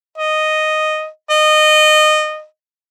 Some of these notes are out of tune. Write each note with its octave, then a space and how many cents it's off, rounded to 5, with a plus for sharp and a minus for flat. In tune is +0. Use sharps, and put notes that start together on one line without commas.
D#5 -5
D#5 -20